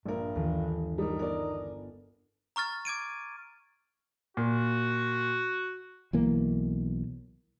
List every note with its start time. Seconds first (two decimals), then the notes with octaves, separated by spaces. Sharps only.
0.05 A#1 G2 A#4
0.35 G1 D#2 D#3 E3
0.98 G3 D#4 A#4
1.19 B3 A#4 D5
2.56 A#5 C#6 F6 A6
2.85 D6 G#6 D7 D#7
4.37 A#2 F#4
6.13 B1 E3 A#3